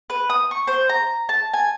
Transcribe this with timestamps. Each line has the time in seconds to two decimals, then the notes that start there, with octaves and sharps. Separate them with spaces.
0.10 B4
0.30 D#6
0.51 C#6
0.67 C5
0.89 A#5
1.29 A5
1.53 G#5